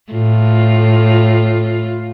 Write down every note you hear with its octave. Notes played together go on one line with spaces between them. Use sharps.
A2 F4